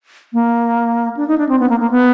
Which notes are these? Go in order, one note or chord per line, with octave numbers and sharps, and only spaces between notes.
A#3
D4
D#4
D4
C4
B3
A#3
A#3
B3